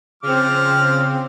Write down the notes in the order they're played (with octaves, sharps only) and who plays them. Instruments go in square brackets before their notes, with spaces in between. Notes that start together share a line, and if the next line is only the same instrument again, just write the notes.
[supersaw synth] C#3 C4 [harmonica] F3 D6 F6